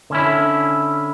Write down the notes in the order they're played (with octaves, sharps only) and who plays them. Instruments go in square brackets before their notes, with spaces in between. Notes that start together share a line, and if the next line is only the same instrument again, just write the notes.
[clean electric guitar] D3 C#4 E4